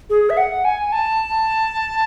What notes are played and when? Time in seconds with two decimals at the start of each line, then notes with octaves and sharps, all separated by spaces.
0.10 G#4
0.30 E5
0.37 F#5
0.65 G#5
0.92 A5